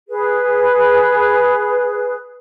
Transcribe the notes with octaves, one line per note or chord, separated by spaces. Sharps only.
G#4 B4